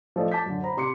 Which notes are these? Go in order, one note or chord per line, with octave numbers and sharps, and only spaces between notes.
F3 A3 F4 A4 D5 D#5
A5 D6 G6 B6
F#2 D3
C5 A#5 B5
C3 C6 D6 C#7